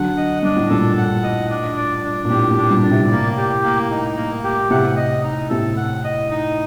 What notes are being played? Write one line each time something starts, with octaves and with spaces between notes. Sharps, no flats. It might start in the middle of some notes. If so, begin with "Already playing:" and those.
Already playing: D3 F#3 F#5
D#5
G2 D4
A2
G2 A#2 A4
F#5
D#5
D4
D5
D4
A#2
A2 G4
A2
D4
G2 A#2
D5
A2 C3
A#3
G4
A#3
D#4
A#3
G4
A2 C3 F#5
D#5
D#4
A2 C3 A4
F#5
D#5
D#4